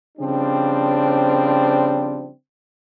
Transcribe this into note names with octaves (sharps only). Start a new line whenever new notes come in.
C#3 F3 G3 C4 D4